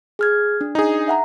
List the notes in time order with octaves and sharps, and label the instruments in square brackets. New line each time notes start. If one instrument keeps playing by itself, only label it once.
[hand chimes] G#4 F6 G#6
D4
[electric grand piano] D#4 G#4
[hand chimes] E5 F#5 A#5